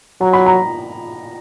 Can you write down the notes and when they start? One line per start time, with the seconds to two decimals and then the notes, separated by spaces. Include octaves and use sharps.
0.21 F#3 A#5
0.33 B5
0.46 A#5